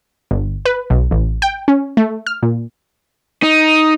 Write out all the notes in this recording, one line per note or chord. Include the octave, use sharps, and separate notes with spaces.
G1
B4
B1
A1
G5
C#4
A3
F6
A#2
D#4